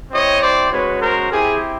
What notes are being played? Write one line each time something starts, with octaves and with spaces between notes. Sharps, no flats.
C4 E4 G4 C#5 D#5
C5 D5
G#3 C#4 F#4 B4 C#5
A#4 C5
C4 E4 G4 G#4